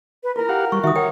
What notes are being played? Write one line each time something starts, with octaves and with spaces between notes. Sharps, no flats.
B4
E4 F4 A#4
G4 F5 F#5
G3 C#6
D#3 F#4 E5 D#6
A#4 C#5 F#5 G5